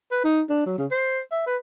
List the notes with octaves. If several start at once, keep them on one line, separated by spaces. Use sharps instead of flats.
B4
D#4
D4
F#3
C#3
C5
E5
B4